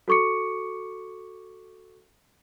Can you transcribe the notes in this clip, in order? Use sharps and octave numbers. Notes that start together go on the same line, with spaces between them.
F#4 A4 C#6 D6 C#7